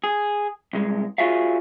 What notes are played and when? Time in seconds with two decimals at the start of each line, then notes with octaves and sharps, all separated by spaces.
0.04 G#4
0.73 C2 G#3
1.18 F4 F#4 G#4 C#5 E5 F5